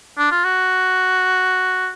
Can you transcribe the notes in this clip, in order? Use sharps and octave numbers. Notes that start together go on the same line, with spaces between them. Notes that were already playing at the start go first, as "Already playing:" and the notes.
D4
F4
F#4